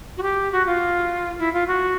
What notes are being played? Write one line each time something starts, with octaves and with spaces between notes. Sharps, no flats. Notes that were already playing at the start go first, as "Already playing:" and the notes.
F#4
G4
F#4
F4
E4
F4
F#4